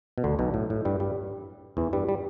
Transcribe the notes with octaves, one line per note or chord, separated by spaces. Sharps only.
B2
D2 D3
B1 B2
A2
A2
G2 G3
G2 G3
E2 E3
G2 G3
G3